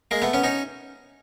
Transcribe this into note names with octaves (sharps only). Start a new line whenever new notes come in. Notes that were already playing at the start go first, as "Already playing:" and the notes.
G#3 A#3
A3 B3
B3 C#4
C#4 D#4